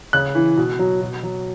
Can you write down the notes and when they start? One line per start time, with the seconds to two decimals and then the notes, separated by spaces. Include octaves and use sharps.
0.13 C#3 F#6
0.35 E3
0.57 B2
0.79 F#3
1.01 B2
1.23 F#3